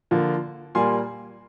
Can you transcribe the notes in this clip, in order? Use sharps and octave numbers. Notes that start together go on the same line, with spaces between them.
D3 F3 A#3
A#2 G3 A#3 G#5 C6